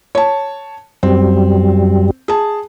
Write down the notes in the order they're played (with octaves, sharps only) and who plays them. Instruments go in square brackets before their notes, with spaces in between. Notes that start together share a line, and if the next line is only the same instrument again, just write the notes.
[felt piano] C#5 A5
[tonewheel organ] F#2 G3 [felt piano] C4
[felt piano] G#4 A5